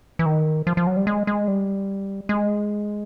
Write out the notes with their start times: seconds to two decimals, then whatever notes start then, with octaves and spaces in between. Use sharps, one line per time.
0.19 E3
0.26 D#3
0.67 F3
0.77 F3
0.87 F#3
0.97 G3
1.07 G#3
1.27 G#3
1.48 G3
2.29 G#3